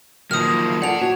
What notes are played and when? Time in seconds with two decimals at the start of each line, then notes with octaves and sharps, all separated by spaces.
0.31 D#3 F3 F#3 A#3 D#6 F6
0.82 F4 G4 A4 D5 F#5 A5 F7
1.01 F#4 C#5